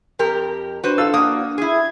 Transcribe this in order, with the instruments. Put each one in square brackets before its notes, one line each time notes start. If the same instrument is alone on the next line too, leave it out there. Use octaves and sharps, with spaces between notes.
[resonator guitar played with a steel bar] F2 G4 A#4
[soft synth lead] D4 [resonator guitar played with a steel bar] F#4 B4 C5
[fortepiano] A4 F5 E6
[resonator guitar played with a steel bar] A#3 F#4 [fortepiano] D#6
[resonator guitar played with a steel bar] E4 G#4 [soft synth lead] G#6